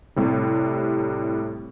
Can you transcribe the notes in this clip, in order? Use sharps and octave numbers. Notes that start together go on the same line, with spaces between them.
A2 C3 G3